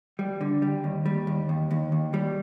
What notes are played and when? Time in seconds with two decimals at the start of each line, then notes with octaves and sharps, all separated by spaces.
0.19 G3
0.41 D3
0.62 G3
0.84 D#2
1.06 G3
1.27 D#2
1.49 D#2
1.71 D#2
1.92 D#2
2.14 G3